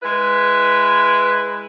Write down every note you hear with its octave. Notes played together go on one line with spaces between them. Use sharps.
G#3 E4 B4